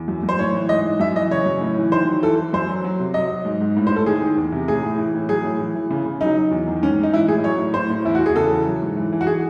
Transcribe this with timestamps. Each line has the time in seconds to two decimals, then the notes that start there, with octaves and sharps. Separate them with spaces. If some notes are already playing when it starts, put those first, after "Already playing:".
Already playing: E2
0.08 F#2
0.23 F#2
0.29 C5
0.39 A2 C#5
0.54 E3
0.69 G#2 D#5
0.85 G#2
1.00 F#2 E5
1.15 E3 D#5
1.30 C#3 C#5
1.45 F#2
1.61 A2
1.77 E3
1.92 D#3 C5
2.08 F#3
2.23 E3 A4
2.37 E3
2.53 F#2 C5
2.69 F#3
2.84 F#3
3.00 C3
3.14 F#3 D#5
3.30 F#3
3.45 G#2
3.60 G#2
3.76 A2
3.87 C5
3.91 A2
3.96 A4
4.06 D#3 G#4
4.22 D#3
4.37 E2
4.52 C3
4.68 A2 G#4
4.83 A2
4.98 E3
5.14 A2
5.29 F#3 G#4
5.45 A2
5.60 E3
5.75 E3
5.91 C#3
6.05 C#3
6.21 F#3 D#4
6.36 F#3
6.51 E2
6.67 D#3
6.82 G#2 C#4
6.98 G#2
7.03 D#4
7.12 E3 E4
7.28 A2 G#4
7.44 F#3 C#5
7.58 A2
7.74 A2 C5
7.90 A2
8.05 E2 E4
8.15 F#4
8.21 E2
8.26 G#4
8.36 C#3 A4
8.51 E3
8.67 F#3
8.82 G#2
8.97 E3
9.12 E3
9.21 F#4
9.27 E3 G#4